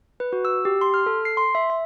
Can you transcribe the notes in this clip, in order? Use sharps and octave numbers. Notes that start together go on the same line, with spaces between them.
B4
F#4
E6
G4
C6
F6
A4
C7
C6
E5
E5